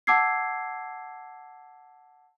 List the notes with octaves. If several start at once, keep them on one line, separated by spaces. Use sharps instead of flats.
F#5 A5 D6 E6 G#6 C7